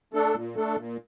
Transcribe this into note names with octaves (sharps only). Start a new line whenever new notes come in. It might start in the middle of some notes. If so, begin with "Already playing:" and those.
A3 D4 A4
A#2
A3 D4 A4
A#2